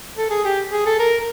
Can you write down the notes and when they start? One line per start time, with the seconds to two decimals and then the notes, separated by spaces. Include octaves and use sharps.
0.17 A4
0.30 G#4
0.45 G4
0.72 G#4
0.86 A4
0.99 A#4